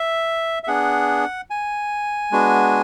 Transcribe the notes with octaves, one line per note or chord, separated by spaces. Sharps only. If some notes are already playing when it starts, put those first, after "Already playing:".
Already playing: E5
E5
B3 D4 G#4 F#5
G#5
G#3 B3 D4 F#4